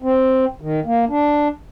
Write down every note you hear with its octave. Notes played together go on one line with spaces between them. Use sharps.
C4
D#3
A#3
D4